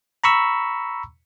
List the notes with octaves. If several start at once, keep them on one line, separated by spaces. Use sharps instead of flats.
A#5 B5 C#6 E6